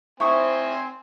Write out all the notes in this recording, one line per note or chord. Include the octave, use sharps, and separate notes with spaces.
C4 E4 C5 G#5 C#6 D#6